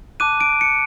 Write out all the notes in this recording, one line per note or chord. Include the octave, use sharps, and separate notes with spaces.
A5 D6 F#6 D#7
D7
C#7